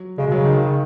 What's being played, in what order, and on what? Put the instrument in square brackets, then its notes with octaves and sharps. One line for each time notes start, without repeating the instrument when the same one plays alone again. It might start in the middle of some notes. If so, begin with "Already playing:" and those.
Already playing: [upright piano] F#3
[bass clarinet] C#3 [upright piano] G#3
[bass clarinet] B2
[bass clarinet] C#3 [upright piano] F#3
[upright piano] D#3
[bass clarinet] C#3